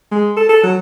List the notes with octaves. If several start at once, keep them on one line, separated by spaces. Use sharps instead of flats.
G#3
A4
A4
F#3